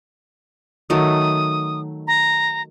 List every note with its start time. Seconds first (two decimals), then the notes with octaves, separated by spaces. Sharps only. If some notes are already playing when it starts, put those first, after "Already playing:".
0.90 D#3 F#3 A3 D#6
2.07 A#5